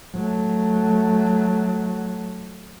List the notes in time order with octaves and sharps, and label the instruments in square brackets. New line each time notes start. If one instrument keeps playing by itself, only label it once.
[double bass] F#3 A3